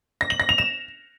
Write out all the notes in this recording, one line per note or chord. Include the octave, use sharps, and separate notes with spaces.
A#6
F#7
A#6
F7
E7